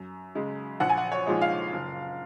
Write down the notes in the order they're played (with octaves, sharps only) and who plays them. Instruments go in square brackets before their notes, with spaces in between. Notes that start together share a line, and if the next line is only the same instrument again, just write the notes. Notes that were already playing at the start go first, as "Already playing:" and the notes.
Already playing: [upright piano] F#2
C#3 G#3
A#1 F#5
G#5
F#5
C#5
A#2 F3 G#3 D#4
F5
F#1